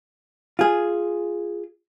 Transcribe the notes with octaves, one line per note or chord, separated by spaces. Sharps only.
F4 G#4